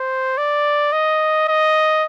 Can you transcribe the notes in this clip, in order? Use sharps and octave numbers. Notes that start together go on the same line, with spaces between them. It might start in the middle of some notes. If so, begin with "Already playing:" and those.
Already playing: C5
D5
D#5
D#5